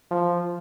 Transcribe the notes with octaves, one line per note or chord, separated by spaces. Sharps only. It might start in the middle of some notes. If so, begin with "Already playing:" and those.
F3